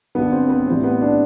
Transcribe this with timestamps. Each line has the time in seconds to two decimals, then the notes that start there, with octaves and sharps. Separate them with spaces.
0.15 G2 D3 F#3 B3
0.32 C4
0.44 C4
0.49 B3
0.67 A2 E3 G3 C4
0.84 B3
1.02 D4